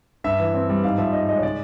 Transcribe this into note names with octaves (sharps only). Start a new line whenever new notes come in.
G2 E5
E3
C4
G3
G#2 F5
F3 E5
G#2 D#5
G#3 D#5
C#5
C#3 D5